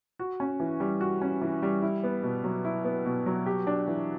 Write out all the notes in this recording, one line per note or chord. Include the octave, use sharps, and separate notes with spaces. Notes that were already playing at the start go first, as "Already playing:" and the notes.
F#4
C#4
E3
G3
F#4
C#4
E3
G3
E4
B3
B2
F#3
E4
B3
B2
F#3
G4
D4
E3